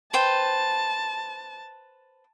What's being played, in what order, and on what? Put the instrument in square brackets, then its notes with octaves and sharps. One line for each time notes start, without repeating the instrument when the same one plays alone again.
[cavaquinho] B4 C5 G5 [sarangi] A5